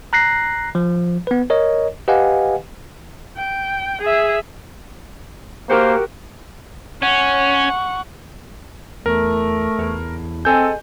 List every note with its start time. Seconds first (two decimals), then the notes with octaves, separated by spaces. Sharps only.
0.13 A#5 F#6 A#6 C7
0.75 F3
1.27 B3 B4
1.50 A#4 C#5 D#5
2.08 G4 B4 D#5 F5 F#5 G#5
3.37 G5
4.01 G#4 E5
5.70 A#3 F#4 G4 A#4 C5
7.02 C#4 F#5 C#6
9.06 E2 A3 A#4
9.79 E2 A2
10.45 C4 G#4 A4 D#5 G6